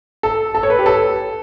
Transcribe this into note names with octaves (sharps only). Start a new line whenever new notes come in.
A4
A4
C#5
B4
G4
A4